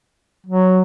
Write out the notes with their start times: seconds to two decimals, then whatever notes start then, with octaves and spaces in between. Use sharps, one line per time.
0.46 F#3